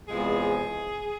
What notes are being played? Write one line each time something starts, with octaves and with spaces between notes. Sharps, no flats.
E2 C3 F3 G#3 G#4